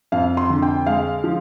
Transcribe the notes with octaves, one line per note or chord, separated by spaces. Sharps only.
F2 F5
C6
D3
G5
G#3 F5
F3